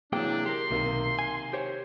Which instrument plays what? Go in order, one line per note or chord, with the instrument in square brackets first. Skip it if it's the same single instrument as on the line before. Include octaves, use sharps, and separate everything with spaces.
[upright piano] C3 E3 F#3 [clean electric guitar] A#3 G#4 G5 [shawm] D4
[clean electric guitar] G4 G#4 A#4 [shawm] C6
[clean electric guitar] B1 [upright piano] C3 D#3 A#3
[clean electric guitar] G#5
G4 C5 C#5